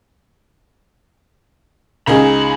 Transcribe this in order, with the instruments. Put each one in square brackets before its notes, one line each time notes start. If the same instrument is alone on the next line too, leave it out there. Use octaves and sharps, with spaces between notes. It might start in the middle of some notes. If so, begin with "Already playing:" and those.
[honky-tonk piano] C#2 D#4 G#4 [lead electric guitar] B5